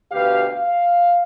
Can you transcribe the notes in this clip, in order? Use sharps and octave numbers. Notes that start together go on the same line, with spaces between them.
D2 B2 G4 B4 F5
F5